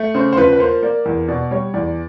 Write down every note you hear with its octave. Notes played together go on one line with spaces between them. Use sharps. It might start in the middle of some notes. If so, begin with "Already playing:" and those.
Already playing: A3
C#3 C5
C5
F3 B4
B4
A#3 C5
A#3 D5
E2
B2 D5
G3 C#5
E2 D5